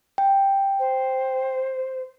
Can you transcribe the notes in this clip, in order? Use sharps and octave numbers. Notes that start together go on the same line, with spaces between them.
G5
C5